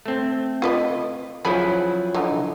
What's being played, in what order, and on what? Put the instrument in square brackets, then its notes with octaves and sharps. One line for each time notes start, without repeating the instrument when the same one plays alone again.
[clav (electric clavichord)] A3 C4
[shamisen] F4 B4 D#5
[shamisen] C#3 G#5 B5 [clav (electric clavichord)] F3 F#3 E4
[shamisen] D3 E3 D#4